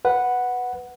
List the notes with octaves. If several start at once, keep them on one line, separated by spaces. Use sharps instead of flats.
B4 F#5